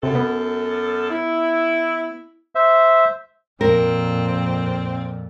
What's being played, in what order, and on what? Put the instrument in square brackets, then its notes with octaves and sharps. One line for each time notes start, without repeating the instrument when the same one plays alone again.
[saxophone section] F#2 A4 [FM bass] C3
[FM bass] B3
[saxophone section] E4
[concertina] C5 E5
[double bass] F2 A#2 [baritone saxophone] C4 [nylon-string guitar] A#4